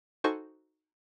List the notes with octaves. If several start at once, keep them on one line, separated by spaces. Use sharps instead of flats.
D#4 F#4 A4 C5 G#5 C#6